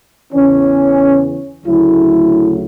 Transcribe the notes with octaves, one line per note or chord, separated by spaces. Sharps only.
E2 C#3 E3 C#4
D2 C#3 F#3 A3 E4